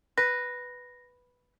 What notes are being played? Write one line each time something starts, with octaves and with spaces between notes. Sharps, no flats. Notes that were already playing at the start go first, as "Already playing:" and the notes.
B4 A#6